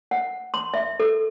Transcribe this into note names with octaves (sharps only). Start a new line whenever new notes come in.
F#5
C6
E5
A4